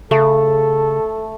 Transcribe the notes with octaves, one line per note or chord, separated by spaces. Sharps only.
C#3 A3 A4